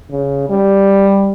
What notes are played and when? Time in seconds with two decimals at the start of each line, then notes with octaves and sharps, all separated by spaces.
0.11 C#3
0.50 G3